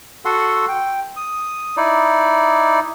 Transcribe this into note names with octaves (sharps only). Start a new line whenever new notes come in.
F#4 A4 F#5 C6
G5
D#6
D#4 E4 D5